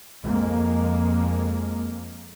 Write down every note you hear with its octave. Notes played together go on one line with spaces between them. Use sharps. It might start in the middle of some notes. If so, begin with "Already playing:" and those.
F2 G#3 A#3